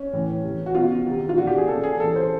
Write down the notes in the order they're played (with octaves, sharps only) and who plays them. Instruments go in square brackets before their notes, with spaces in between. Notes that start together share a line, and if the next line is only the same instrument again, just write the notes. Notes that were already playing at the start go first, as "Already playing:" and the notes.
Already playing: [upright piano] C#4
A2 E3
C3 E3
F#4
B2 F4
C3 D#3
F4
A#2 F#4
G4
G#4
A#2 A4
G#4
C3 E3 A4
C5